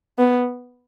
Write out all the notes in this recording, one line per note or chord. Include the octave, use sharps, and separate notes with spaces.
B3